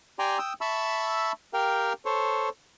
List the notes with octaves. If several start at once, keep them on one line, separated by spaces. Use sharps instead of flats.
G4 D5 G5 G#5 A#5 C6
G5 D#6 E6
E5 A5 B5 C#6 E6
G4 A#4 F5 G5
A4 C5 C#5